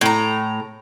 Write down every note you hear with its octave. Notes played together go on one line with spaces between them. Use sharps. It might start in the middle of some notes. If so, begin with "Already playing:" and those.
A2 A#5